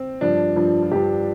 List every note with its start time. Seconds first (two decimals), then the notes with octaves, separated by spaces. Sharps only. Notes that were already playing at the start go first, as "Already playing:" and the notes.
Already playing: C4
0.21 G2 F3 D4
0.56 G2 F3
0.83 F4
0.91 G2 F3 G4